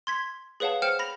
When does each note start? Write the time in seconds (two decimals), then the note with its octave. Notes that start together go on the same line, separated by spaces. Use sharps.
0.07 C6 G#6 B6
0.60 G#4 B4 C#5 F5 F#5 A5
0.82 C5 G5 F6 C#7 E7
0.99 B5 A#6 F7